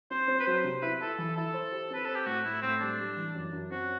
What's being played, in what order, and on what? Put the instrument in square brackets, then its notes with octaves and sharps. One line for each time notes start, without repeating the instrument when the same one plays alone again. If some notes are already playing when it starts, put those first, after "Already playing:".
[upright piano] C4 [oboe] C5
[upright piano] C4
[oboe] B4
[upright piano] F#3 [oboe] C5
[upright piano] C3
[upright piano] E4 [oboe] B4
[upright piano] E4 [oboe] A4
[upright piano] E3 [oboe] A4
[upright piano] E4 [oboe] A4
[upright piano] C5
G4
[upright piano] C4 [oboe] B4
[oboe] A4 [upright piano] C5
[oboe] G4
[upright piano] A2 [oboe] F#4
[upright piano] A2 [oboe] E4
[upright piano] A2 [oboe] C4
[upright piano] G3 [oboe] D4
[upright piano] G3
E3
F#2
F#2
[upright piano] C4 [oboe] F#4